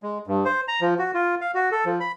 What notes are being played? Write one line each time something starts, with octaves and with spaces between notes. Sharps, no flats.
G#3
G2
C5
A#5
F3
F#4
F4
F5
F#4
A4
F3
B5